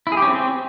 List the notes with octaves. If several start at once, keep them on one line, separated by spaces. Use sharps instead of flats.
E4
G#4
G4
C#4
C4